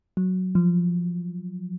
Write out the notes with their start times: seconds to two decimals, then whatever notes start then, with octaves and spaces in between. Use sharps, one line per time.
0.17 F#3
0.55 F3